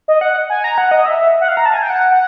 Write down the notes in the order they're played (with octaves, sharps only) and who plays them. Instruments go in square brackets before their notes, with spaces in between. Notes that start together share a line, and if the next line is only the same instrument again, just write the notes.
[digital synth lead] D#5
F#5
G#5
A#5
F#5
D#5
E5
F#5
F5
A#5
A5
G#5
G5
F#5
F#5